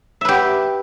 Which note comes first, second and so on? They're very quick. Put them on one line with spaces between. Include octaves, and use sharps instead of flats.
E5 B4 G4